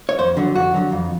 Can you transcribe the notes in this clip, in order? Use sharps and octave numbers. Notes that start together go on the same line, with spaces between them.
C#5
F2 C5
D3 F#3
F2 F#4
D3 F#3
F2